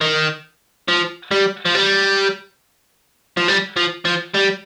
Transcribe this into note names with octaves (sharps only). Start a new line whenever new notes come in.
D#3
F3
G3
F3
G3
F3
G3
F3
F3
G3